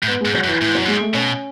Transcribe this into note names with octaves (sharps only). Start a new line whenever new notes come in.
A2
G#2 B3
G#2 G#3
F#3
F#2
E3
A2 E3
G#2
F#2 F#3
G#2 G#3
A3
B2 C#4